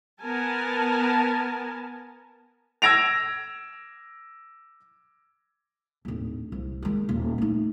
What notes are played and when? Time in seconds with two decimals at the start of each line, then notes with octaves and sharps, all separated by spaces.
0.22 B3 A#4 G#5 A5
2.82 E6 G#6 A#6 D7 F7
6.05 D1 D#2
6.52 C2
6.82 D#3 G#3
7.09 D#1
7.38 A3 D#4